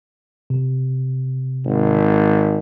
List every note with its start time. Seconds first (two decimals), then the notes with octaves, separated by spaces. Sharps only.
0.50 C3
1.65 G#1